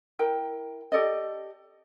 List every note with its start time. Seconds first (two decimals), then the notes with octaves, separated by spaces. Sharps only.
0.19 E4 A#4 G5
0.92 G4 A4 D5 D#5